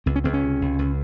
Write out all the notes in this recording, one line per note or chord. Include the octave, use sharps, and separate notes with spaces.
C#2 C4
C#4
C#2 C4
C#4
C3
C#2
C#2